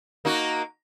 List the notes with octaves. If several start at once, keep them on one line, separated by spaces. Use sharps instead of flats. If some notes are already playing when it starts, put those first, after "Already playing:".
A#3 D#4 F#4